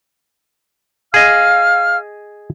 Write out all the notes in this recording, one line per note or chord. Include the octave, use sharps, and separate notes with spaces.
G#4 D#5 F5 F6